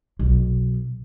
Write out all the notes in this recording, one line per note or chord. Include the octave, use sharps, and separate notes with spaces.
B1